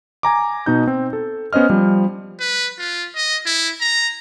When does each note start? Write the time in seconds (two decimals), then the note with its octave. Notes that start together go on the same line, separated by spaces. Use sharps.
0.23 G#5 A#5 D6
0.66 B2 D#4 G6
0.87 C4
1.13 A4
1.53 B3 C#4 C5 D#5 F6
1.70 F3 G3
2.40 B4
2.79 F4
3.16 D#5
3.46 E4
3.81 A#5